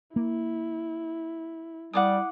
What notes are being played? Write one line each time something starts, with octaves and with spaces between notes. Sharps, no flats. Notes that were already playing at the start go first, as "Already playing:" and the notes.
A#3 E4
G3 E4 F#5 D6 D#6